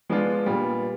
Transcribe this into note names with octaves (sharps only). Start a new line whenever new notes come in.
F3 G#3 B3 D4 F4
A#2 G3 B3